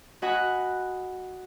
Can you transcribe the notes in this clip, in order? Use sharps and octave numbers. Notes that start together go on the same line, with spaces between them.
F#4 D#5 F#5 G#5 B5